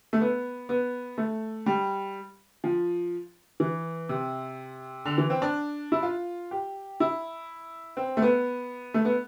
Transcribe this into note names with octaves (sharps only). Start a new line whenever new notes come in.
A3
B3
B3
A3
G3
F3
E3
C3
D3
E3
C4
D4
E4
F4
G4
E4
C4
A3
B3
A3
B3